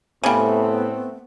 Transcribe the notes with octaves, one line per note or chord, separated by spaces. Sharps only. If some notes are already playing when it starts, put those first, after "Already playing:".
A2 C#3 G3 A3 B3 C4